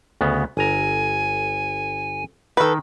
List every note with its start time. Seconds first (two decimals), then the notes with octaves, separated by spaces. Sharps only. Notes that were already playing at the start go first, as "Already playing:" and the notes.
0.21 D2 C#3 B3
0.57 G1 G#5 A#5
2.57 D#3 D#4 A4 B4